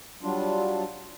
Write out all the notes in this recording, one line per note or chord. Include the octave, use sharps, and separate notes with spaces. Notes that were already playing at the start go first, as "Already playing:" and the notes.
F#3 G3 D4 F4